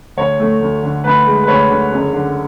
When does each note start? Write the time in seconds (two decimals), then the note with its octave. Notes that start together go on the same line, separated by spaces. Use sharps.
0.17 D2 C#5
0.40 A3
0.61 D2
0.83 D3
1.04 D2 B4
1.26 G#3
1.43 B4
1.48 D2 C#5
1.70 D3
1.92 F#1
2.13 D3